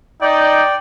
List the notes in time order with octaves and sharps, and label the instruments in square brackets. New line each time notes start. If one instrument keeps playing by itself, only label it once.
[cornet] D#4 [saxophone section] D5 [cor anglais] G5